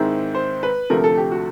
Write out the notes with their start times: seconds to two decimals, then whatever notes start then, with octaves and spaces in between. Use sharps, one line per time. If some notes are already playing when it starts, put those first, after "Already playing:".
Already playing: G#2 D#3 G#3 C4 E4
0.35 C5
0.63 B4
0.90 D2 C3 F3 A3 A#4
1.04 A4
1.17 G4
1.31 F#4